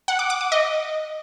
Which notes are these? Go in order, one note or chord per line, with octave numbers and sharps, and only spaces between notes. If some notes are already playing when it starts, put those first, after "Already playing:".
F#5
D6
D6
D6
D#5